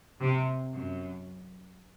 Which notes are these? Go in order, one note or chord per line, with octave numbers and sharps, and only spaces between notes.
C3
F#2